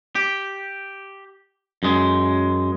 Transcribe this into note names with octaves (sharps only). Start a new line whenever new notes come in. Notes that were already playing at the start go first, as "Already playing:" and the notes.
G4
F#2 G#3